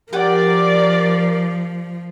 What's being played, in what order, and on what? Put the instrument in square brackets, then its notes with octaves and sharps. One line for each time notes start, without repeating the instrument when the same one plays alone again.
[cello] F3 [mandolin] G4 F#5 G5 [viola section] A#4 D5